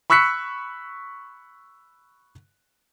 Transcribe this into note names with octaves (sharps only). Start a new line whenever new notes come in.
B5 C#6 E6 F#6 B6 C#7